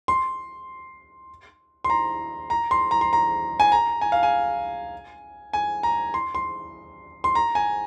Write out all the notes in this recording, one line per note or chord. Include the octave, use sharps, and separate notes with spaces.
C6
C6
A#5
A#5
C6
A#5
C6
A#5
G#5
A#5
G#5
F5
G#5
G#5
A#5
C6
C6
C6
A#5
G#5